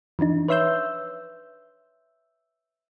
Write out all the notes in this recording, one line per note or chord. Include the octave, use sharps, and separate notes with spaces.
E3 F3 D4 D#4
B4 C#5 E5 C6 E6 G6